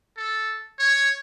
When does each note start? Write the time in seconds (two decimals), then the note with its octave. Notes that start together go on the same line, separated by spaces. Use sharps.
0.17 A4
0.79 C#5